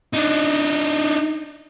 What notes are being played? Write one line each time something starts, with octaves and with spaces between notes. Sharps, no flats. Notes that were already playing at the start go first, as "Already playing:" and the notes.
D4 D#4